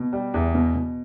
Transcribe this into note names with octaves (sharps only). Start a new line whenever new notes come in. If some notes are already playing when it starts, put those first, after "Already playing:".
Already playing: B2
G3
E2
B2
B2